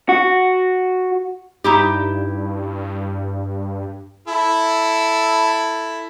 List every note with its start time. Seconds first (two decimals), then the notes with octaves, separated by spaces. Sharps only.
0.09 F#4
1.64 G2 D#4 E4 G4
4.28 E4 A4